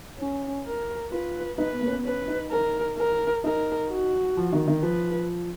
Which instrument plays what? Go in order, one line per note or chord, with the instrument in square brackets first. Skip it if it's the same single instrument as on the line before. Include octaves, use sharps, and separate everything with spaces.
[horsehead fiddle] C#4
A#4
[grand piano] F4 [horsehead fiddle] B4
[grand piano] D#4 [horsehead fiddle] B4
[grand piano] B3
A#3
C#4
B3
[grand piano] C#4 [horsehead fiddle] B4
[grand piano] D#4
[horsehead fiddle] A#4
A#4
[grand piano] D#4 [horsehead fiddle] A#4
[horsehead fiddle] F#4
[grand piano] F3
D#3
D#3
[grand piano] F3 [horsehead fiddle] B4